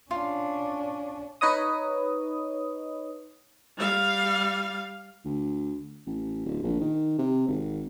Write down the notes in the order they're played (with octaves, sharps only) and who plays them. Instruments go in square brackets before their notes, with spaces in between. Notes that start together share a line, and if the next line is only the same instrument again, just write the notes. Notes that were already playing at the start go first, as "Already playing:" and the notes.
[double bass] C#4 D4 [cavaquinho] F4
[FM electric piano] D#4 B4 C#5 D#5 D#6
[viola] G3 F5
[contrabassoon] D2
A1
D1
A#1
D#3
C3
G#1